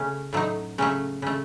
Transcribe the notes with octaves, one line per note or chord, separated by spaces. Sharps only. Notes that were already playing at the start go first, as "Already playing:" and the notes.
Already playing: C#3 A3 C#4
A2 F#3 A3 D#4
C#3 F#3 A3 C#4
C#3 A3